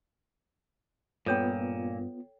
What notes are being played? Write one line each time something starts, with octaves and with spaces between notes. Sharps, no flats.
G2 A#2 B3 F4 A4 C#5 G5